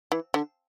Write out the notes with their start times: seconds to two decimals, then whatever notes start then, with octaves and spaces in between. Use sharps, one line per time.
0.12 E3
0.34 D3